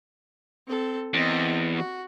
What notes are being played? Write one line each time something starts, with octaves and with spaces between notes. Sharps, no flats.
C4 A4
E2 C4 D#5
F#4